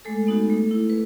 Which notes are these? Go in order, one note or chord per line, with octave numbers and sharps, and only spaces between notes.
G#3 A3 A4
B3 D#4 F#4
A3
E4
B4